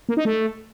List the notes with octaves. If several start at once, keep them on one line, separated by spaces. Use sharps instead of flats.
A#3
D#4
A3